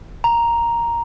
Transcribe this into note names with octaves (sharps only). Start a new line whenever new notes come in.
A#5